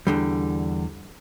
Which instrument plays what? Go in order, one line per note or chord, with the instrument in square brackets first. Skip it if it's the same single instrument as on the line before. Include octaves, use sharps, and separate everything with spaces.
[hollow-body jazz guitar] E2 D3 G3